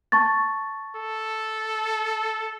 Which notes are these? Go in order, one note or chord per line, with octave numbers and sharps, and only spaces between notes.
A5 C#6 A6
A4